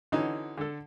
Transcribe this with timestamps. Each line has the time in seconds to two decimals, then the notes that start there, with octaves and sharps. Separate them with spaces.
0.12 D3 E3 C#4 D#4 F#4
0.58 D3 A4